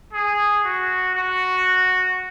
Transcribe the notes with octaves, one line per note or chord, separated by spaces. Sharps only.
G#4
F#4
F#4